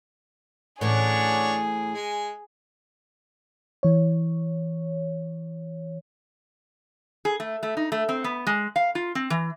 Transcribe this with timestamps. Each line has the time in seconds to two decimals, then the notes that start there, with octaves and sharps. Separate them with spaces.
0.81 A2 E3 C#4 D4 G#4 C#5 F#5
1.94 G#3 G#5
3.83 E3 C#5
7.25 G#4
7.40 A3
7.63 A3
7.77 D#4
7.92 A3
8.09 C4
8.24 B3
8.47 G#3
8.76 F5
8.95 F4
9.15 C4
9.30 E3